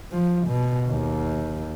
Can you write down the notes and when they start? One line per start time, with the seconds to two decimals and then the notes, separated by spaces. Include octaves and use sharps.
0.12 F3
0.47 B2
0.88 D#2